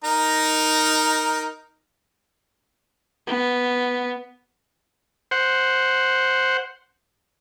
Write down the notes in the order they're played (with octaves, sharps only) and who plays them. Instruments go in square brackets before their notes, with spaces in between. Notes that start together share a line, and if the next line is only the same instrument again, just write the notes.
[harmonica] D#4 A#4 A#5
[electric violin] B3
[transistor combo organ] C5 F#5